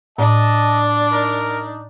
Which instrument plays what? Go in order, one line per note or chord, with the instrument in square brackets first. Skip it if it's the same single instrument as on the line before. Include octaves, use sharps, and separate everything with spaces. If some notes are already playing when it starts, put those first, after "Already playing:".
[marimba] A2 [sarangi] D4 [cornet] D#5 [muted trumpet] A5
[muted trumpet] D#4 [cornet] A#4